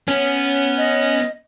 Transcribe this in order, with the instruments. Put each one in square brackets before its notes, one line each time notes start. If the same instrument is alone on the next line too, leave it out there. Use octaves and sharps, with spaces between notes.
[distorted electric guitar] B3 [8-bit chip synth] C#4
[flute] D#5